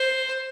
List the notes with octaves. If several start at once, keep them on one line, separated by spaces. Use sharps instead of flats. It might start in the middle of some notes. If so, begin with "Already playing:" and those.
Already playing: C5